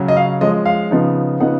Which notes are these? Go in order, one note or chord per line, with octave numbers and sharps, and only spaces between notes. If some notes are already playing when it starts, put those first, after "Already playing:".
Already playing: C#3 F#3 C#4
D#5
F5
F3 G#3 C#4 D#5
F5
C#3 F3 B3 D#4
C#3 F3 B3 D#4 F#5